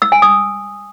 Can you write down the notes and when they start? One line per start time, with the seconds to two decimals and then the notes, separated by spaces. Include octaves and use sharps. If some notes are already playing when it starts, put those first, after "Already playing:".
0.02 E6
0.12 G#5
0.22 D#6